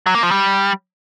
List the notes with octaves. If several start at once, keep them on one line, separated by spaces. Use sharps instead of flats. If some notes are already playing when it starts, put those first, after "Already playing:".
F#3
A#3
F3
G3